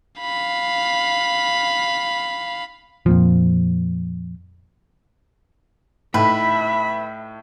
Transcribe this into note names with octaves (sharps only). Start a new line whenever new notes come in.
F5 B5
F2 A#2 F3
A2 D#4 B4 E5 B5